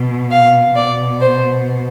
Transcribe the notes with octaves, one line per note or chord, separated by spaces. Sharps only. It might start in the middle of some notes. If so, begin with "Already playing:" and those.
Already playing: B2
F5
B2 D5
C5